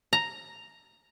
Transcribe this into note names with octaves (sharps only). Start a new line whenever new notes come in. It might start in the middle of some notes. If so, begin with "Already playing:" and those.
A#5